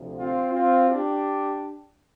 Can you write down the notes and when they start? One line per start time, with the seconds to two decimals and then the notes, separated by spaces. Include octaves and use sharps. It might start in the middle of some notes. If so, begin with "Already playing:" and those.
Already playing: D2 C3 F3
0.16 C4 F4
0.52 C4 F4
0.89 D4 G4